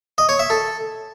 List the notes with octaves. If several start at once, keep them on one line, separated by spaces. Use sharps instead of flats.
D#5
C#5
E5
A4